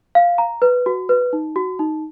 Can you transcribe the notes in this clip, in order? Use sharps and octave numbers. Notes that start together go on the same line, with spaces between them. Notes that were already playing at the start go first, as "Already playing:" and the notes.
F5
A#5
B4
F#4
B4
D#4
F#4
D#4